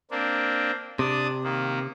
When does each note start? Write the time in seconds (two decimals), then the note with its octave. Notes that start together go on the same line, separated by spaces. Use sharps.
0.11 A#3 C4 D4
0.99 C3 D4 D5 D#6
1.44 D#3 A#3